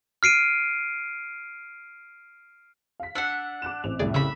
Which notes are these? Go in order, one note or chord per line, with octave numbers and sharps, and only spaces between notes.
F6 C7 D7 D#7
F5 B6
D4 F#5 E6
D6 F#6 E7
A1 C4 F7
C2 F2 A2 G#4 D5
C#3 E5 B5